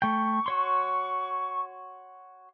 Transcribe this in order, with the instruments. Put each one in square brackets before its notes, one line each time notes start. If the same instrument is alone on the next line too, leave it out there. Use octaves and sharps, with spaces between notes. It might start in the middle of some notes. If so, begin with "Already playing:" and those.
[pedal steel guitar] A3 G5 [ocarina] C#6
[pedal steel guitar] F#4 C#5 C6